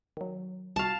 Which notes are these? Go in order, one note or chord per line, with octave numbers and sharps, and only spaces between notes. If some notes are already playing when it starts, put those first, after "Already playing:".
D#3 F#3
C2 F#4 F5 A5